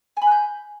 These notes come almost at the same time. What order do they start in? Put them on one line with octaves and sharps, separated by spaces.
G#5 B5 F#6 G6